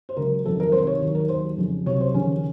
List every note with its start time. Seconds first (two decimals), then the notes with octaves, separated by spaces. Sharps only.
0.09 C5
0.17 C#2 C#3 F#3 A#4
0.44 F2 D#3 F#3 A4
0.60 A#4
0.72 C2 C3 D#3 C5
0.87 C#5
1.00 D#2 D#3 F#3
1.15 A#4
1.29 D#2 D#3 F#3 C5
1.57 F2 C#3 F3
1.86 C2 C3 F#3 C#5
2.01 C5
2.14 D#2 C#3 F3 C#4